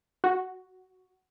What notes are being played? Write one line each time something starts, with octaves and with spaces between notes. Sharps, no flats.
F#4